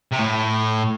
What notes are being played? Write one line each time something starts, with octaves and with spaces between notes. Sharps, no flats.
C3
A2